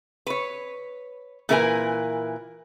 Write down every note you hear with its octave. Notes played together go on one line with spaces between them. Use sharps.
B4 C#5
A#2 E3 E4 A#4 B4 G#5